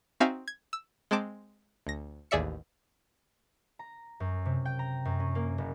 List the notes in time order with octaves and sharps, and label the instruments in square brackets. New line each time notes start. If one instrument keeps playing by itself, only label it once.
[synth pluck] C4 D#4 F#4 E5 F5 G#5
G#6
E6
G#3 C4 A5 D6
D2 A#6
A1 D#2 G#4 D5 E5 C#7
[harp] A#5
F#2
C3
G5
A#5
F#2
C#4
A#3
F#1